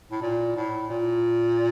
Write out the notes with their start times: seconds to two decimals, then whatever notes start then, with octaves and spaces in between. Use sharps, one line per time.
0.12 A2
0.22 A#2
0.56 A2
0.90 A#2